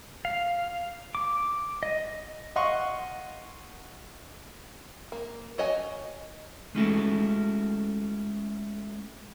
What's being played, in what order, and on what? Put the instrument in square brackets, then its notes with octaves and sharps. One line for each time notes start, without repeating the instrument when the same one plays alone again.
[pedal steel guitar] F5
D6
D#5
[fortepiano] D#5 F5 F#5 C6 C#6
[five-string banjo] A#3
F#4 C#5 D#5 F#5 G#5
[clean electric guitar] G#3 A3 C#4 E4 F#4 A4